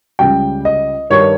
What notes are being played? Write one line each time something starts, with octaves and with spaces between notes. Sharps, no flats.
C#2 C#3 G3 G5
D#5
G2 D#3 G3 C#5